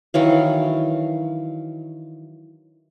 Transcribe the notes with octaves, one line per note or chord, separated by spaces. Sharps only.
D#3 E3 F#3 F5